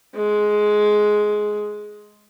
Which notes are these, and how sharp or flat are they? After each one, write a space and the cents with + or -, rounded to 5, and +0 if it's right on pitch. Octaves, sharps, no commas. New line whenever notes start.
G#3 +10